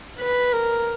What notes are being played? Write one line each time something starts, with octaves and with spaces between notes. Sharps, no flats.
B4
A#4